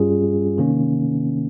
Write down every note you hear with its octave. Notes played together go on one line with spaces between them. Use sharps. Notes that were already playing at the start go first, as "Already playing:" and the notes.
Already playing: G2 G3 C#4 F4 G#4
C3 D#3 A#3 C#4